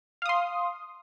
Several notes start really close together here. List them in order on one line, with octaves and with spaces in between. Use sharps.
F5 D#6 C6